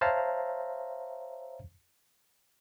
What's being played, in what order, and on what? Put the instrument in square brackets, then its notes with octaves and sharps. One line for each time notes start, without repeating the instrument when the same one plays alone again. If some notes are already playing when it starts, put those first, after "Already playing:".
[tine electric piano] C5 C#5 E5 F5 A5 A#5